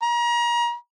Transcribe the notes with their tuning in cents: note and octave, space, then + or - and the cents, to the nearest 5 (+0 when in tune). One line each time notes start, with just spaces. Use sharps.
A#5 +35